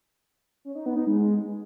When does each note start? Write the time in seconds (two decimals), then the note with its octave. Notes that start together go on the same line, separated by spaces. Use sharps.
0.65 C#4
0.75 D#4
0.86 B3
0.97 D#4
1.07 G#3